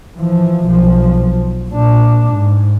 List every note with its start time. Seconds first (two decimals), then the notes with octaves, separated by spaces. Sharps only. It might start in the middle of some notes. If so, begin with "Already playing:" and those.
0.17 E3 F3
0.66 B1 F3
1.70 A#2 D4
2.32 G#2